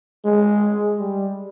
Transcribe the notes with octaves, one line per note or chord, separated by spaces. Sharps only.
G#3
G3